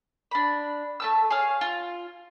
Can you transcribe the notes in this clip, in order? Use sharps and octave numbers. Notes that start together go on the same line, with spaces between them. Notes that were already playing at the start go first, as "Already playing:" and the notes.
D4 B5
A3 A5 E6
G#4 C#5 F5
F4